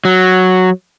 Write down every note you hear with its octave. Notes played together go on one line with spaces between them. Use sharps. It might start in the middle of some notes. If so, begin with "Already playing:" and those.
F#3